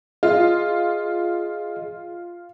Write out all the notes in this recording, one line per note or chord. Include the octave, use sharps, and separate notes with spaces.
F4 G#4 D#5